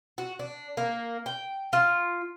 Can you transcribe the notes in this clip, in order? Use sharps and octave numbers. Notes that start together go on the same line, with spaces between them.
F#4
D4
A#3
G5
F4